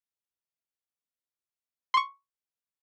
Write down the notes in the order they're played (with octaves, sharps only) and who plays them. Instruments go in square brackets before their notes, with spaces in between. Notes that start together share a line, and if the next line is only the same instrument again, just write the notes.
[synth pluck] C6 C#6